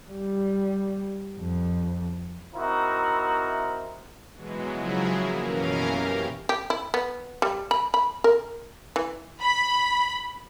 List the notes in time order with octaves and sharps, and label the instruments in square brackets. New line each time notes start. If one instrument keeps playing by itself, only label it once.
[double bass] G3
F2
[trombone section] C4 D#4 E4 F#4 A#4 C5
[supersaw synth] B2 E3 F#3 G#3
C#3 F3 F#3 E4 G#4
A#3
F#2 B2 E3 C#4 A#4 F5
G4
[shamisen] G4
E4
B3
G3
B5
B5
A#4
E3
[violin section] B5